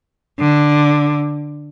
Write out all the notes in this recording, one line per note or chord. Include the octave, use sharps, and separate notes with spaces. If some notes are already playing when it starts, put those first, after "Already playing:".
D3